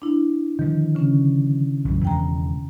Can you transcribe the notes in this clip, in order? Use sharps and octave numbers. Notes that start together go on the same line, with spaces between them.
D4 E4
D3 D#3 F3
C#3 C#4
B1 F#2 A#2
E2 B2 G#3 G5 A#5